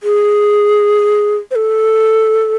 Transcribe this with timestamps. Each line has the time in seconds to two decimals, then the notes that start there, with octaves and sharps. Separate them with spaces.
0.03 G#4
1.51 C5
1.55 A4